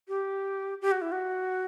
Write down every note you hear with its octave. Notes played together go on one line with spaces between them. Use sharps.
G4
G4
F#4
E4
F#4